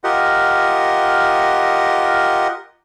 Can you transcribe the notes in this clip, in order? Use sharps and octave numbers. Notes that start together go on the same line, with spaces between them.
F4 G4 A#4 D#5 F#5